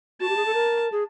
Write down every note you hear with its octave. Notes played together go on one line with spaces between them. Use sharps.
F#4 A5
G4
G#4
A4
A#4
G#4